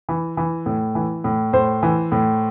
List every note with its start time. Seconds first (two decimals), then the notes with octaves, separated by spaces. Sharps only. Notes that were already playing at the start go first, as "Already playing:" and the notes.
0.09 E3
0.37 E3
0.66 A2
0.95 E3
1.24 A2
1.53 A2 C5
1.83 E3
2.12 A2